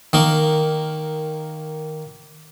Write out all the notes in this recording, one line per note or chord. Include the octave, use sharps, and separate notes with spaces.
D#3 A#3